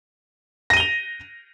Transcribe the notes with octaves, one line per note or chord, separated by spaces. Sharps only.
A#6 D#7 F7 G7